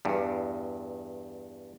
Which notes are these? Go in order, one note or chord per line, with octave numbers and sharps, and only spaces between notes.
E2 G2